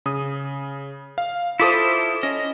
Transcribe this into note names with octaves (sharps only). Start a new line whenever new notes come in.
C#3 D#6
F5
E4 F4 A4 C5 D6 D#6
C#4 D#5